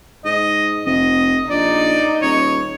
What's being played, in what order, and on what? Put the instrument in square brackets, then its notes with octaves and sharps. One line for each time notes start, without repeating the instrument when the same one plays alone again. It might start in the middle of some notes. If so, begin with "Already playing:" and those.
[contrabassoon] G#2 [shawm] D#5
[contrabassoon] F1 [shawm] D#5
[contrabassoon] A#1 [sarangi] D#4 [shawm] D5
[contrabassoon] D#1 [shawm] C#5